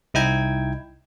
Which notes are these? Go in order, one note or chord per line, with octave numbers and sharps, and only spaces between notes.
C2 D#4 E4 G5 G#6